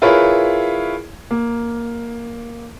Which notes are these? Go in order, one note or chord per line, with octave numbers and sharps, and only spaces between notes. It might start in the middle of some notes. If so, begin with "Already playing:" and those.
E4 F4 G#4 A#4 B4 C#5
A#3